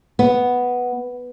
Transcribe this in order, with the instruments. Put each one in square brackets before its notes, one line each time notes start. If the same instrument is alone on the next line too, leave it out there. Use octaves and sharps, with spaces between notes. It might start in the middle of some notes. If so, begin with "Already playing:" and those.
[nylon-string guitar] B3